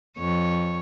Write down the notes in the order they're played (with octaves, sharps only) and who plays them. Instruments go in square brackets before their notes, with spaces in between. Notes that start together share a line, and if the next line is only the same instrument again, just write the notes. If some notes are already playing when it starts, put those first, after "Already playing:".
[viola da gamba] F2 C#5